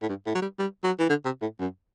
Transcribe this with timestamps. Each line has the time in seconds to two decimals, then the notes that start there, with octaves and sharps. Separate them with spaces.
0.02 A2
0.09 G2
0.26 A2
0.35 F#3
0.42 G3
0.59 G3
0.84 F#3
0.99 E3
1.09 D3
1.25 C3
1.42 A2
1.59 F#2